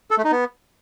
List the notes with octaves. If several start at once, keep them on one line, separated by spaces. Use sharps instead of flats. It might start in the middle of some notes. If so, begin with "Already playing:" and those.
A4
A3
D#4
B3